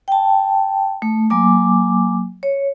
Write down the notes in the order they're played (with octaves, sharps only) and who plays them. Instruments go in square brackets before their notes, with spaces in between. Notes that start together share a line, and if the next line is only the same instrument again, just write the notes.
[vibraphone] G5 A5
A3
F#3 A#3 G#5 D6
C#5